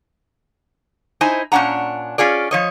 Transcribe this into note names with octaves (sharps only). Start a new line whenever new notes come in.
D#4 E4 C5 G#5
A#2 C#4 D4 F#5 A#5
C#4 F4 G#4 D5
F3 C#5 D#5